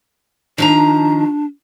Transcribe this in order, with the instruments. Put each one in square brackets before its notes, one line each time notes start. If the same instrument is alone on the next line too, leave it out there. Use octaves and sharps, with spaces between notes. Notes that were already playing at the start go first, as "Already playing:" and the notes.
[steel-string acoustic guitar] D#3 F3 A#5 [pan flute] D4